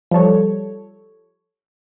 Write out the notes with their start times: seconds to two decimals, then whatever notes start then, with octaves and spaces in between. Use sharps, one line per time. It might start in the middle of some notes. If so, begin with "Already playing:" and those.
0.11 F3 G3 A4 C#5